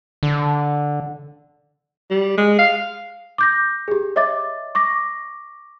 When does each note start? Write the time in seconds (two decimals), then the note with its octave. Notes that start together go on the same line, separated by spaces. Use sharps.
0.23 D3
2.11 G3
2.38 G#3
2.59 F5
3.38 D6 G6 A#6
3.88 G4 G#4
4.16 C#5 D#5 E5 D6 A6
4.75 C#6 D6 A#6